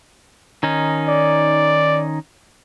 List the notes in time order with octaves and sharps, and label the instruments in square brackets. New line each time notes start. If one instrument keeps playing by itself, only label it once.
[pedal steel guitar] D#3 C#4 D#4
[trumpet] D5